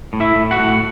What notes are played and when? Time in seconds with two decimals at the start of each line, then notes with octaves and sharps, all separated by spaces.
0.13 A2
0.20 E4 E5
0.35 A2
0.51 F#4 F#5
0.59 A2